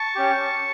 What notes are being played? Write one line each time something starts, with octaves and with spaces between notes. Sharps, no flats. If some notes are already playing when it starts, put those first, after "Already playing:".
Already playing: A5 C#6
C#4 G4